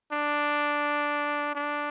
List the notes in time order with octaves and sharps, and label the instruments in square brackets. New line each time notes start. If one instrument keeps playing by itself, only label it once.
[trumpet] D4
D4